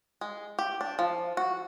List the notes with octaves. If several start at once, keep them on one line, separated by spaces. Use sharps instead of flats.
G#3
G4
D4
F3
F#4